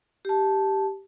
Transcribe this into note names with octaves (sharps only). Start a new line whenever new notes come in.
G4 A5